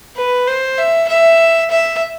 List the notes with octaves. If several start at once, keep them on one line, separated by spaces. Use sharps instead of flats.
B4
C5
E5
E5
E5